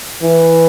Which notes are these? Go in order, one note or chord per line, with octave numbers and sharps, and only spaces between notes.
E3